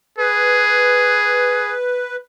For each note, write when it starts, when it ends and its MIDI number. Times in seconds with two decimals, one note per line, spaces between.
0.18 1.75 68
0.18 2.16 71